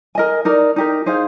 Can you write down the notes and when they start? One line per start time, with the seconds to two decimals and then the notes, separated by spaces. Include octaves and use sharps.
0.15 A#4 D#5 G#5
0.45 D#4 A#4 D5
0.76 D#4 G4 A#4
1.06 D#4 G#4 C5 F5